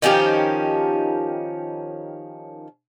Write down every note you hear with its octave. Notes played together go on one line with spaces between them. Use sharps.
D#3 F3 C#4 G4